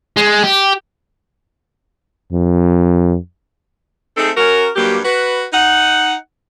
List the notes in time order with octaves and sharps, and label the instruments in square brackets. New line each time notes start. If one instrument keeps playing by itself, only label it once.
[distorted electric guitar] G#3
G4
[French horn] F2
[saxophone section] A3 C4 D#4 G#4 A4
C#4 F#4 A#4
G2 F#3 A#3 G4
F#4 B4
D#4 F#5